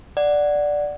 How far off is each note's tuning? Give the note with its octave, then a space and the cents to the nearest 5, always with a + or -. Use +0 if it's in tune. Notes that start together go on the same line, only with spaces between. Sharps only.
D5 +0 F#5 +0